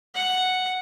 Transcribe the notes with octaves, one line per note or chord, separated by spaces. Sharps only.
F#5